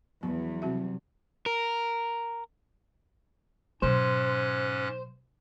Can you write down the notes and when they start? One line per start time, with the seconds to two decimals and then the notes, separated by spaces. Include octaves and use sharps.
0.23 E2 F#3 B3
0.62 C3 G3 C4 F#4 E5
1.46 A#4
3.82 G#2 B2 F#3 C#4 C5 F#6